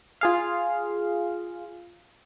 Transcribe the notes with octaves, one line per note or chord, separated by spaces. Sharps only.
F4 G#4 F5